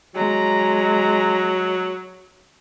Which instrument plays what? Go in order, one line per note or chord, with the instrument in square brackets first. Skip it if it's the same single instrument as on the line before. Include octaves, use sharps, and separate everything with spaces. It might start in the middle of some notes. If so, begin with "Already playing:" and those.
[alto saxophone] F#3 [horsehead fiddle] G#3 A#5